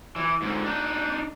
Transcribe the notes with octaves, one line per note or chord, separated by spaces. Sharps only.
E3
G#2 D3
D4 D#4